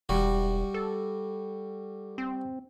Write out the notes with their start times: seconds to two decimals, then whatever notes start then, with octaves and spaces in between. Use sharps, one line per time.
0.09 E1 G3 F#4
0.74 A4
2.18 C4